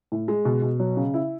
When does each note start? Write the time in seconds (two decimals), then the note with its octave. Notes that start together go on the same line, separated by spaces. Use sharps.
0.12 A2
0.28 G#3
0.45 B2
0.62 B2
0.80 F#3
0.97 C#3
1.14 E4